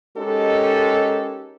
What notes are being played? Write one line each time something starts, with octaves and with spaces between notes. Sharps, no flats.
G#3 C#4 D#4 G4 A4 A#4